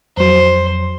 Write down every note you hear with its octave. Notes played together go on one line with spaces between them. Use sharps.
F2 F#3 C5